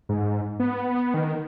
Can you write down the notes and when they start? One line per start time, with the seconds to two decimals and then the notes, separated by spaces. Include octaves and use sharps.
0.09 G#2
0.60 B3
1.14 D#3